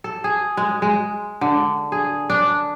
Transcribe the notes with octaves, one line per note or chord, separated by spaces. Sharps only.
A4
G#4
G#3
G#3
D3
G#4
D4